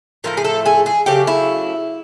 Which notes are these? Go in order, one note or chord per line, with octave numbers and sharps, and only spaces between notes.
A2 F3 A3 A#4
G#4
A4
G#4
G#4
C#3 F#3 A3 G4
E4